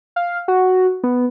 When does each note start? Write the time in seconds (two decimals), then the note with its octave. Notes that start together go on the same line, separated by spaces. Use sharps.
0.16 F5
0.48 F#4
1.04 B3